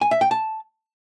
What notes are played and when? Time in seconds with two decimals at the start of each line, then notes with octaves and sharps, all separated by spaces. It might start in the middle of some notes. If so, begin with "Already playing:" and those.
0.01 G#5
0.11 E5
0.21 G5
0.31 A5